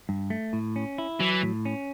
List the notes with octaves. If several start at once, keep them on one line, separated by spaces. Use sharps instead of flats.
G2
A3
A2
C#4
E4
E3 F#3
A2
C#4